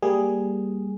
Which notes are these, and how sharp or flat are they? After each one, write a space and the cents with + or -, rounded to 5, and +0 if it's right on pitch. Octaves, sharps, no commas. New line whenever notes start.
G3 +0 A#3 +0 G#4 +0